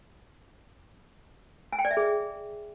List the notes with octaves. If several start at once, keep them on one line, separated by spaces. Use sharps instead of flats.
G#5
G5
D5
E5
G#4